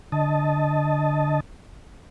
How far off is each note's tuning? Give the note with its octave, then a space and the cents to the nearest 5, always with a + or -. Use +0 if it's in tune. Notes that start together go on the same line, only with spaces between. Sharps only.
D3 +0 D#5 +5 A5 +0